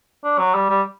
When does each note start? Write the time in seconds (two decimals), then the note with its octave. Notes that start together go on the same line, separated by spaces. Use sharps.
0.24 D4
0.39 F#3
0.55 G3
0.69 G3